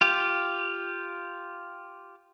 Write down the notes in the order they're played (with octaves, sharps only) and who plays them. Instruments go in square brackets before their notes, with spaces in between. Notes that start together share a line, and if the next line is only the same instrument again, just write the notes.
[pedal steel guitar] F4 G4